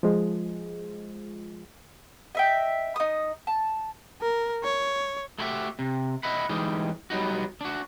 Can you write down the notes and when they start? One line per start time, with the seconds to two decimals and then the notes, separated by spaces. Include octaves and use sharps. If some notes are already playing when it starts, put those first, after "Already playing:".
0.03 F3 G#3
2.35 D#5 E5 G5
2.96 D#4 D#6
3.47 A5
4.22 A#4
4.64 C#5
5.39 A3 E4 F#4 G4 E5
5.79 C3
6.23 D#5 E5 F#5 B5
6.49 E3 G3 G#3 D#4
7.10 F#3 G3 B3 D#4 F#4
7.61 D4 F#4